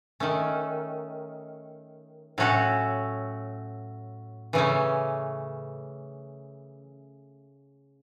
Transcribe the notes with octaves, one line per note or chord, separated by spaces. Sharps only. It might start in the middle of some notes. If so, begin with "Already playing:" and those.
D#3 A3 C#4
A2 F#3 C#4 F#4 A4
C#3 E3 A3 C#4